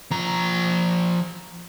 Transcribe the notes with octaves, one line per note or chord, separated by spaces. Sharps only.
F3 A#5